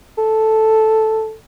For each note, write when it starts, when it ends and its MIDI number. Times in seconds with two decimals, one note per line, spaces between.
0.18 1.34 69